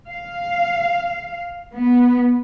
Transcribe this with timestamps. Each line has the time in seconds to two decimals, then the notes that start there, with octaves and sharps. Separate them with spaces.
0.10 F5
1.75 B3